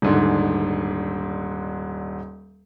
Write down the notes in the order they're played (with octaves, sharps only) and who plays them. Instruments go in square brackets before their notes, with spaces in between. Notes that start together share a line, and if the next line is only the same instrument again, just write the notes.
[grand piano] D#1 G#2 D3